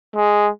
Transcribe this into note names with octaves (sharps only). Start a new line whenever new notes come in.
G#3